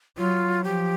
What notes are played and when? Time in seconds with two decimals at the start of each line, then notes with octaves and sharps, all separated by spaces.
0.17 F#3 F4
0.64 F3 G4